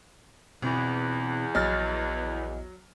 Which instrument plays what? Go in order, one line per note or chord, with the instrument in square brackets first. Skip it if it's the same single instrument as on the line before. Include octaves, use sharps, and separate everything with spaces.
[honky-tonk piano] G1 [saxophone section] E2 [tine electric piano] B2 C4
[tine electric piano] A#1 D#5 [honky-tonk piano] F#3 F6 A6